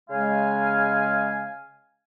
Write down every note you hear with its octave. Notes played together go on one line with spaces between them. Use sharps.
C#3 G#3 F5 G#5